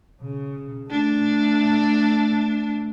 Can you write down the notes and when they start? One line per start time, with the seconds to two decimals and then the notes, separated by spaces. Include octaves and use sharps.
0.22 C#3
0.90 A3 D4